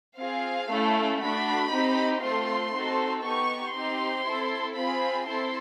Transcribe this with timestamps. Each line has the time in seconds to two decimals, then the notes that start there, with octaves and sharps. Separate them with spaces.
0.18 C4 F4 G#4 F5
0.69 A3 C#4 E4 A4
1.20 A3 D4 F#4 B5
1.71 C4 D#4 G4
2.22 A3 C4 F4 A4 C6
2.73 C4 D#4 F#4 A4
3.24 B3 D#4 G4 C#6
3.75 C4 D#4 G4 C6
4.26 C4 E4 A4
4.76 C4 F4 G#4 B5
5.27 C4 E4 A4 C6